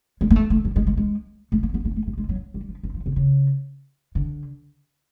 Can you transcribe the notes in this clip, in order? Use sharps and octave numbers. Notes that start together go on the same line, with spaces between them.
G#3
A#3
A3
A3
G3
G#3
G#3
G#3
A3
A#3
B3
A#3
A3
A3
G#3
F#3
G3
F3
E3
F3
C3
C#3
D3